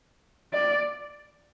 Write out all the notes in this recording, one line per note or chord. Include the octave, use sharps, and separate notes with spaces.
D5